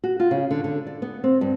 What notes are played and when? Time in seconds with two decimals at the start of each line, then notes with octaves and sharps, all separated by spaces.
0.04 F#4
0.20 F4
0.31 C#3
0.51 D3
0.64 D3
0.87 D5
1.02 B3
1.24 C4
1.41 G2